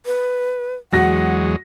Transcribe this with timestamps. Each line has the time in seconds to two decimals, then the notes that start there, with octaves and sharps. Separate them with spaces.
0.06 B4
0.93 E2 F#3 G#3 F#4 F#5 A#6